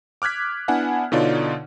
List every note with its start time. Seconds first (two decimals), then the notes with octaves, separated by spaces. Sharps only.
0.22 D6 F6 F#6 G#6 B6
0.68 B3 D4 E4 F#5 G#5
1.12 B2 D3 D#4 F4 C#5 D5